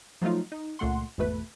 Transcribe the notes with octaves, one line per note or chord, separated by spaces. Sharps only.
F3 F#3 A3 D#4 F4
D#4
C#2 A#2 A3 F#5 C6
G#1 E2 B2 A3 B4